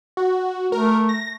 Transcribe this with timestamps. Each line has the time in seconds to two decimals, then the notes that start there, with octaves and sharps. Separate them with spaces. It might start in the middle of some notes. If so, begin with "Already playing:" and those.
0.17 F#4
0.72 A3 A#4
1.09 A#6